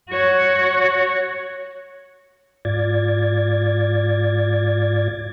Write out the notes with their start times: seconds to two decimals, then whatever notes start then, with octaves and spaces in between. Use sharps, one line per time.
0.10 F#4 C#5
2.65 G#2 F4 D5 G#6 A6